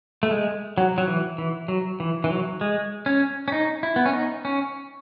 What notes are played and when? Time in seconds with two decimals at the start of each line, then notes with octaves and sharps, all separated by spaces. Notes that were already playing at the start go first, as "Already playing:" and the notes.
0.23 A3
0.31 G#3
0.78 F#3
0.98 F#3
1.08 E3
1.38 E3
1.68 F#3
2.00 E3
2.24 E3
2.30 F#3
2.61 G#3
3.06 C#4
3.48 C#4
3.52 D#4
3.83 E4
3.96 B3
4.06 C#4
4.13 D#4
4.45 C#4